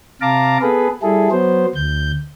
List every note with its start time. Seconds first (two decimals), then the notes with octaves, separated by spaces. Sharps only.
0.21 C3 F5 A5 A#5 D6
0.62 B3 G#4 A4 B4
1.02 G3 E4 G#4 A4
1.31 F#3 B3 C5
1.75 D2 G6